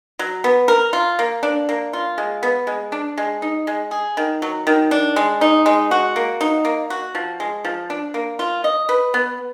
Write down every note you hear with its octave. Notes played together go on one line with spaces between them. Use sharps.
F#3
B3
A#4
F4
A#3
D4
A#3
F4
G#3
B3
G#3
D4
G#3
D#4
G#3
G#4
D#3
F#3
D#3
D4
G#3
D#4
G#3
F#4
A#3
D#4
A#3
F#4
F3
G#3
F3
D4
A#3
F4
D#5
B4
B3